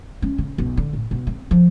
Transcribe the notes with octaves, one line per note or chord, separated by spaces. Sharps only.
C#4
C#3
B1
D3
A2
B2
C4
F3